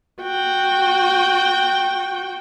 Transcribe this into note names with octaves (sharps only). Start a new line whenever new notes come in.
F#4 G5